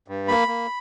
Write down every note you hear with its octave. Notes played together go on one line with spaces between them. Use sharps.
G2
A#3 B5
A#3